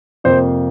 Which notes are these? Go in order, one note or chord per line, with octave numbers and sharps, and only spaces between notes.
F2 C3 F3 A#3 C5